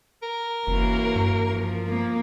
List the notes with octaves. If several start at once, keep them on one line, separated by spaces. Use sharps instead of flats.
A#4
F#1 E3 A#3 C#4 F#4
G2
F3
A#3